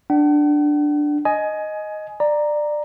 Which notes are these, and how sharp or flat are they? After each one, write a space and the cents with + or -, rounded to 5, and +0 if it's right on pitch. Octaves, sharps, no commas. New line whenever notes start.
D4 +5 F#5 +45
D#5 +0 G#5 +20
D5 +20 A#5 +0